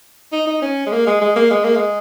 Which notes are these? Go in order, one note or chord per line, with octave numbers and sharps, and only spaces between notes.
D#4
D#4
C#4
G#3
A#3
G#3
G#3
A#3
G#3
A#3
G#3